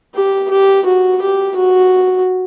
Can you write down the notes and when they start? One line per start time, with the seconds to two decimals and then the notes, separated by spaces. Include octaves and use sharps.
0.15 G4
0.50 G4
0.86 F#4
1.21 G4
1.57 F#4